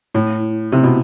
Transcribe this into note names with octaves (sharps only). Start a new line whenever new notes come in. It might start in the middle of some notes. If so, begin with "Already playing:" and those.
A2
C3
B2